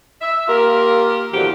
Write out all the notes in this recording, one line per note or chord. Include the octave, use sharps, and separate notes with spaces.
E5
A#3 F4 G4 A#4
E2 A2 D3 F3 F#4 G4